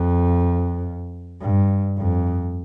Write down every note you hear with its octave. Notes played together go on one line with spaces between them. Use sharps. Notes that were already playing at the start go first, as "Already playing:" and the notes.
Already playing: F2
G2
F2